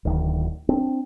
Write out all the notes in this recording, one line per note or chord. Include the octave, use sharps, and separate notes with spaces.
D1 D2 D#3
C4 D4